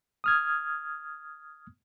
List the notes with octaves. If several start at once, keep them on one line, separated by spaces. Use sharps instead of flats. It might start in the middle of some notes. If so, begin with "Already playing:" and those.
D#6 F6 G#6